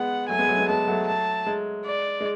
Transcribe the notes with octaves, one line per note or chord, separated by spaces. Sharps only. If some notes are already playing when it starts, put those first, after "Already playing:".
Already playing: G#3 B3 F#5
F#3 A3 G#5
G#3 B3
F#3 A3
G#3 B3
G#3 B3 A5
F#3 A3
A5
G#3
D5
G#3